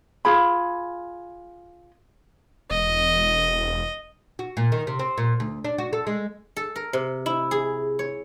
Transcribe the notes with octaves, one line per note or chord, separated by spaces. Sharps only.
F4 G#4 B5
E1 D#5
F#4
A#2
D#3
C3
C4
A#2
D2
D4
F#4
A4
G#3
A4
A#4
C3
E4
G#4
C#5